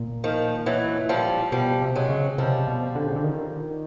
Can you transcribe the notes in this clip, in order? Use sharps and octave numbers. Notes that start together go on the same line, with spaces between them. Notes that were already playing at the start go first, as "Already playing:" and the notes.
Already playing: A#2
D#3 F3
E3 F#3
F3 G3
B2 F3 G3
C3
F#3 G#3
C#3
C3 F3 G3
B2
D3
C#3
D3
D#3